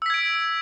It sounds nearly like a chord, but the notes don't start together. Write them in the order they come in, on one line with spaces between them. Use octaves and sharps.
E6 B6 G#6 D7